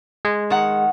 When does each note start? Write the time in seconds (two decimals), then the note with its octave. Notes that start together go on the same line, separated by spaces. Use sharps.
0.25 G#3
0.50 D#3 F#5